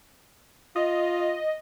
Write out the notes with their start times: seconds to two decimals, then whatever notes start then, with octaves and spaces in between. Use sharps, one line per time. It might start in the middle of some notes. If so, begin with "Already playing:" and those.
0.76 F4 D#5